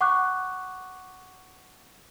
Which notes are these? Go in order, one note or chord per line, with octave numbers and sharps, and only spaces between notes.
F#5 C#6 D6 F#6